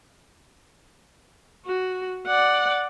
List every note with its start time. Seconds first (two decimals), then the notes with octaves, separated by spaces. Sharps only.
1.66 F#4
2.28 D5 F#5